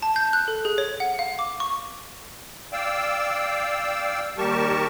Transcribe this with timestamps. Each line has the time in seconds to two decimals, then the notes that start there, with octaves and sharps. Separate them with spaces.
0.02 A5
0.16 G6
0.33 F#6
0.48 A4
0.65 G#4
0.78 C#5
1.00 F#5
1.19 F5
1.39 D6
1.60 C#6
2.73 D5 F5 G5 E6
4.38 D#2 G3 G4 A#4 A5 C#6